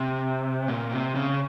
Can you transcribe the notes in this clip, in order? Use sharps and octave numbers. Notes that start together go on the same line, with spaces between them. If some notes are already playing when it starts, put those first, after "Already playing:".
Already playing: C3
A#2
C3
C#3